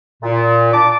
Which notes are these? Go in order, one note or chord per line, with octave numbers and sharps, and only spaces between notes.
A#2
D4 A5 D6